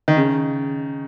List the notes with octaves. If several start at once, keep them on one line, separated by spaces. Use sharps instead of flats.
D#3
C#3